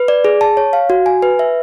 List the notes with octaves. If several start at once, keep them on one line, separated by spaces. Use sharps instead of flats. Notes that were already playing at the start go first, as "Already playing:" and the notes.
Already playing: B4
D5
G#4
A5
C#5
F5
F#4
G#5
B4
E5